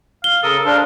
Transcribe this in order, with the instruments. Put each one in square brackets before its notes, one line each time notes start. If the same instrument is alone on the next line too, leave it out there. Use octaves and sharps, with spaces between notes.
[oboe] F5 [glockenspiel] G7
[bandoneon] C#3 A#4 D#6 [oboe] A4
[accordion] D4 [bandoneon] C5 [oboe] F5